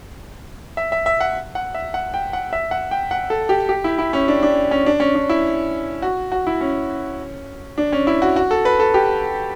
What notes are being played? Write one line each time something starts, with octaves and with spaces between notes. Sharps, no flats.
E5
E5
E5
F#5
F#5
E5
F#5
G5
F#5
E5
F#5
G5
F#5
A4
G4
G4
E4
E4
C#4
D4
D4
C#4
D4
C#4
D4
E4
F#4
F#4
E4
C#4
D4
C#4
E4
F#4
F#4
A4
B4
A4
G4